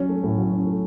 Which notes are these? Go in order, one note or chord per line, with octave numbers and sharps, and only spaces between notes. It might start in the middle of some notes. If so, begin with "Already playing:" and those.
Already playing: F#3 C#4
A3
A2
F#3
C#4
A3